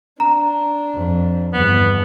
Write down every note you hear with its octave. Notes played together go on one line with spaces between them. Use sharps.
D4 A#5
F2
G1 E2 B3